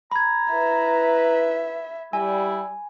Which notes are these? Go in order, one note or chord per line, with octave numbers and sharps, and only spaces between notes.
A#5 B5 G#6
E4 B4 E5
G3 E4 G#5